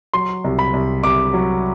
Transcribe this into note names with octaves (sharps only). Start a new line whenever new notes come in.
F#3 C6
C2
B5
C2
C2 D6
F#3